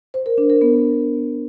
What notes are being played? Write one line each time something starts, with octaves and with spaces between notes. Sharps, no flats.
C5
A#4
D4
A#4
B3